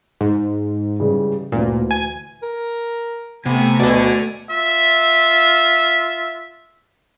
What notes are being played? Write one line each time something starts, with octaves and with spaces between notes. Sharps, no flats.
G#2 D#4
C#3 E3 G3
D2 A#2 E3
G#5
A#4
C3 A3 B3 G#5
D2 B2 A4 D5
F4 E5